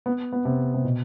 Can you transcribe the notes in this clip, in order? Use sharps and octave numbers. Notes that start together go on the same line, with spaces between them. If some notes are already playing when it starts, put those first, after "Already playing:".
B3
B3
C3
C3
B2